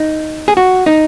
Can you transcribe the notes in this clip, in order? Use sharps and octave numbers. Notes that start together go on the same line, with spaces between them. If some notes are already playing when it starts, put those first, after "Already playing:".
Already playing: D#4
G#4
F#4
D#4